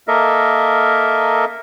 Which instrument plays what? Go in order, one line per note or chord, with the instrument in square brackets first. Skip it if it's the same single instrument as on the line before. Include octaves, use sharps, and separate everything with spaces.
[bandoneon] A#3 A4 A#4 D#5 E5